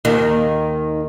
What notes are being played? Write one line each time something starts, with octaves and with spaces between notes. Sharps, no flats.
D#2 D#3